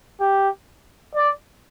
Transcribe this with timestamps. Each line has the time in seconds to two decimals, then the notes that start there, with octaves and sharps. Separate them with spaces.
0.20 G4
1.15 D5